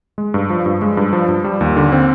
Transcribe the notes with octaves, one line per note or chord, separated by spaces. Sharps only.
G#3
G2
F3
G2
G#3
G2
F3
G2
G3
D#2
D3
C4